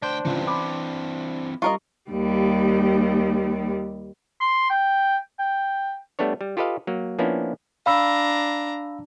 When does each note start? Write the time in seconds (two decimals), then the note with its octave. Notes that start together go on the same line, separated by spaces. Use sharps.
0.02 D2 D4 C5 G5
0.25 G1 C#2 G2 E3 C4
0.47 B5 D6
1.62 G3 F4 A#4 D#5 C#6
2.10 D#2 G3
4.40 C6
4.70 G5
5.39 G5
6.19 G3 A3 B3 D4 C#5
6.41 G3
6.57 F4 G4 A4 B4 D#5 F5
6.87 F#3 A#3
7.19 F3 A#3 B3 C#4 D4 E4
7.86 D4 F5 A#5 B5 E6